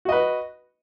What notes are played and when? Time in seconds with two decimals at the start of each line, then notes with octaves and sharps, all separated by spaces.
0.05 F#4
0.09 D#5
0.12 B4